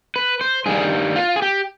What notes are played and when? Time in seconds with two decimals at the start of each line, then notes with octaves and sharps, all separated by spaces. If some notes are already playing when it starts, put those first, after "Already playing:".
0.16 B4
0.41 C5
0.66 G2 D#3 G3 G#4
1.16 F4
1.36 G#4
1.42 G4